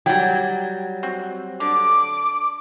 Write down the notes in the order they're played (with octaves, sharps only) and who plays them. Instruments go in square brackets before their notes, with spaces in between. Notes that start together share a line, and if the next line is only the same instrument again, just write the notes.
[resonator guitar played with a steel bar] F#3 G3 [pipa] G5
[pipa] C4 F#4
[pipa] D3 [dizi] D6